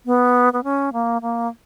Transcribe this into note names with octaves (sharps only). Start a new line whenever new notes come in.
B3
B3
C#4
A#3
A#3